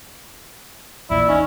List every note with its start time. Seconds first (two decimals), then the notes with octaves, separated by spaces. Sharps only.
1.10 A#1 E2 A#2 E4 D5
1.29 E2 C#4 D#4